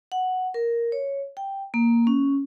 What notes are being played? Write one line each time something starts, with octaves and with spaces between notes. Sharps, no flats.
F#5
A#4
C#5
G5
A#3
C#4